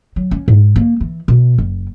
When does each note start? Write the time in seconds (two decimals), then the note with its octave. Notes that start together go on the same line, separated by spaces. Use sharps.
0.16 F#3
0.31 C#4
0.48 G#2
0.76 A#3
1.00 E3
1.28 B2
1.58 F#1